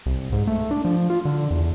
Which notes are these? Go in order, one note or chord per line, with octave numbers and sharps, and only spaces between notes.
C2
G#2
A3
D4
F3
F4
D3
E2